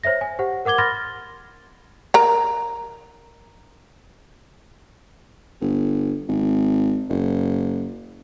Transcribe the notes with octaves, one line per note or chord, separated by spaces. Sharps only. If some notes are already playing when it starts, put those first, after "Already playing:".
C5 C#5 E5 A#6
G#5
G4 C5 F#5
A#4 F#5 D6 G#6 G7
B5 C6 F6 A6 A#6
A#4 A#5
G1
G#1
F#1